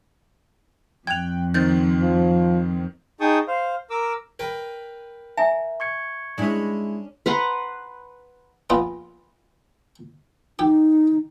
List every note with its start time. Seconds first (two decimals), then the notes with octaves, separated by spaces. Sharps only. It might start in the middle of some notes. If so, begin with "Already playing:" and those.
1.07 F2 G5 F#6 G#6 F7
1.54 D#3 C4 G6 A6
2.01 F3
3.20 D#4 G#4 G5 A5 C#6 D#6
3.48 C5 F5
3.90 A#4 D6 E6
4.39 A#4 B4 G5
5.37 E5 G#5 A#5
5.80 C#6 G#6 C#7
6.38 G#3 C#4 D4 E4
7.26 B4 F#5 A#5 C6
8.70 A#1 B3 F4
10.59 D#4 G4